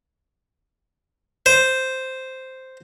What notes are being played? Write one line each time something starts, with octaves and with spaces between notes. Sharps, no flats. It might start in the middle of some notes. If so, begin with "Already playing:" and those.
C5